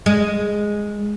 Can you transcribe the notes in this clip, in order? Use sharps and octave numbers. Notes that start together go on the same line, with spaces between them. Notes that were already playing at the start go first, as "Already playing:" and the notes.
G#3